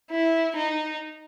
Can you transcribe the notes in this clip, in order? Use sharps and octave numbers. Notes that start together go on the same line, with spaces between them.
E4
D#4